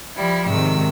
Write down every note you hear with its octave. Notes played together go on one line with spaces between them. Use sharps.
F3 G3 E4
G#2 C3 D#3 E6